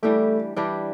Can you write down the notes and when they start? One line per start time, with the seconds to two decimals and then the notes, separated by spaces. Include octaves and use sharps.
0.03 E3 G3 A3 D4 G4
0.56 E3 G3 D4 G4